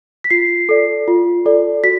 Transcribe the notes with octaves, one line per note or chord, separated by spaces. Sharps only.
B6
F4 C7
A4 D5
F4
A4 D5
F#4 B6